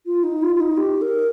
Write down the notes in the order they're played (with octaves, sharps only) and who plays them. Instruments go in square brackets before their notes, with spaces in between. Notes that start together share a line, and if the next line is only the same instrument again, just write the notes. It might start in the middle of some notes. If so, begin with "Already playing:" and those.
[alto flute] F4
D#4
F4
F4
D#4
G4
A#4